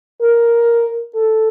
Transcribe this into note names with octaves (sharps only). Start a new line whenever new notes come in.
A#4
A4